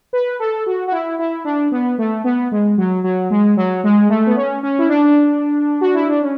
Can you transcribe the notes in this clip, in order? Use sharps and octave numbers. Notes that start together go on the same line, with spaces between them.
B4
A4
F#4
F#4
E4
E4
D4
B3
A3
B3
G#3
F#3
F#3
G#3
F#3
G#3
A3
B3
C#4
C#4
E4
D4
F#4
E4
D4
C#4